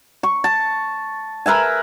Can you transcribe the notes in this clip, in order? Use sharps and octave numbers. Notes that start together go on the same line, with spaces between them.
C#6
A5
A#4 B4 E5 G#5